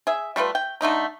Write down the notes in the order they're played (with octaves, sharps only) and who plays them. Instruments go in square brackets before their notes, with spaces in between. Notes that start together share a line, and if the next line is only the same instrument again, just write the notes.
[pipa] G#4 E5
G3 A3 F4 B4
G5
D3 A3 D#4 A#5